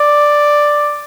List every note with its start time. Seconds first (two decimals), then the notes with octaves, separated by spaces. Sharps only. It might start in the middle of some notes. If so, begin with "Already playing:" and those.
Already playing: D5